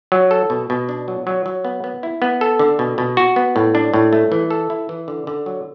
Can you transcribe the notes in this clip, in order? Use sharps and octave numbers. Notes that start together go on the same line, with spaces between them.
F#3
A4
B2
B2
D4
F#3
F#3
F#3
B3
B3
E4
B3
A4
D3
B2
B2
F#4
B3
A2
D4
A2
A3
E3
A4
E4
E3
D3
D3
F#3